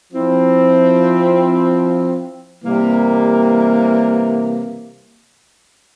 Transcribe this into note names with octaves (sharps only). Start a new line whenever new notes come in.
F3 C4 E4
C3 E3 G3 A#3